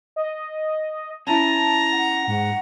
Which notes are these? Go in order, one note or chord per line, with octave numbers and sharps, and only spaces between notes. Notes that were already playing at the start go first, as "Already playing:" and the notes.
D#5
C#4 E4 A5 A#5
F#5
G#2 F#5